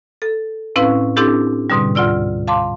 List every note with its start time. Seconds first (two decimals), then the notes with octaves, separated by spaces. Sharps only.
0.22 A4
0.76 A2 C4 C#4 E4 B4 F5
1.16 C4 D4 E4 G4 A4
1.70 G#2 B2 D3 G3
1.95 D2 G#2 F4 D5 E6
2.48 F5 A5 C6 D6